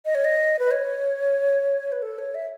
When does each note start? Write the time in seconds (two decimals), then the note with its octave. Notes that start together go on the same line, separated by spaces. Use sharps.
0.05 D#5
0.15 C#5
0.25 D#5
0.59 B4
0.71 C#5
1.92 B4
2.02 A4
2.18 C#5
2.35 E5